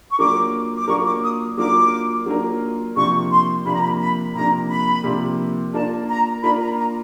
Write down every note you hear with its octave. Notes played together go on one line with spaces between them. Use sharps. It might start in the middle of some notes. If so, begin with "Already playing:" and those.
C#6
F#3 A#3 D4 F4 A#4 D6
D6
F#3 A#3 D4 F4 A#4 C#6
D6
D#6
F#3 A#3 D4 F4 A#4 D6
F#3 A#3 D4 F4 A#4
C3 F3 A#3 D4 C#6
C6
C3 F3 A#3 D4 B5
A#5
B5
B5
C3 F3 A#3 D4 A#5
B5
C3 F3 A#3 D4
A#3 D4 F4 A#4 D5 A5
A#5
A#3 D4 F4 A#4 D5 B5
A#5
A#5